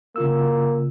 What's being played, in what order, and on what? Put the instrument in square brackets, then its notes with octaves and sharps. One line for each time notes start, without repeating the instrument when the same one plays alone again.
[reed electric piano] C#3 F4 E6 [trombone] A#3